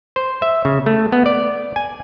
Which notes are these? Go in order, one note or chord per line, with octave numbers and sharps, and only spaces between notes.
C5
E5
C#3
A3
B3
D5
G#5